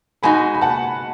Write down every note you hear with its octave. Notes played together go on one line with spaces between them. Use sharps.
B2 G#3 D#4 F#4 G#5 B5
B5
F#5 A5